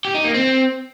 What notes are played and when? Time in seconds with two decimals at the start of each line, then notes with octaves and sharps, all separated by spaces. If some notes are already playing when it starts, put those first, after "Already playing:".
0.05 G4
0.15 D#4
0.24 A#3
0.34 C4